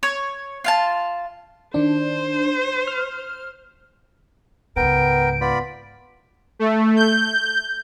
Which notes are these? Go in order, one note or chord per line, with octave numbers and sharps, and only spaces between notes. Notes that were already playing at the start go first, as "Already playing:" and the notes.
C#5
F4 F5 A5
D#3 D4 C5
F6
C#2 G#2 B3 A#4 G5 D7
B3 F4 D5 B5
A3
G6